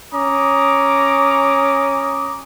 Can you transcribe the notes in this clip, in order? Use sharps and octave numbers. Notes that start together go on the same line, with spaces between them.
C#4 A#5 D6 D#6